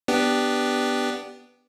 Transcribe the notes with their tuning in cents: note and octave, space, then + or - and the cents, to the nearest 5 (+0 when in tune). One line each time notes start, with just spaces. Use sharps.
B3 +0 D4 +0 G4 +0